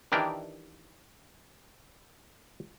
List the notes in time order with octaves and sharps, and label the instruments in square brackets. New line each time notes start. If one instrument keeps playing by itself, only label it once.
[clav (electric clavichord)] D#3 E3 D4 G4 A#4